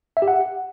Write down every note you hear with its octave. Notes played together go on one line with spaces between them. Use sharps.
E5
G4
F#5